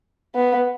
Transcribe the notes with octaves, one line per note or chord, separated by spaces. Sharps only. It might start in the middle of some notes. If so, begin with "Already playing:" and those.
B3